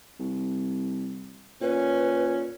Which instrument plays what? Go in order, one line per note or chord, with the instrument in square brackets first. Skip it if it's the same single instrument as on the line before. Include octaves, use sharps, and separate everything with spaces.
[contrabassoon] C2
[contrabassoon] A#2 [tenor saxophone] C#4 [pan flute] B4